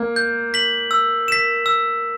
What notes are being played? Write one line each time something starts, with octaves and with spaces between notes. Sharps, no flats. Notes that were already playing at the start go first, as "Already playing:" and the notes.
Already playing: A#3
G6
B6 F#7
E6
B6 E7
E6